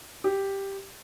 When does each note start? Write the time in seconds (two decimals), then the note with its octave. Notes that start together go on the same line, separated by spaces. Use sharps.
0.24 G4